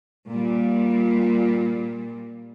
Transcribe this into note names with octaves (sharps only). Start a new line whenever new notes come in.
A#2 G3